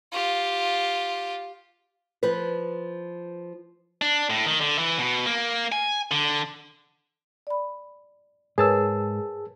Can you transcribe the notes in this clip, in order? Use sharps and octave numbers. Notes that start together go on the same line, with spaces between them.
F4 G4
F3 B4
D4
A2
D#3
D3
E3
B2
A#3
G#5
D3
D5 B5
G#2 G#4 A#4 B4 C#5 A5 E6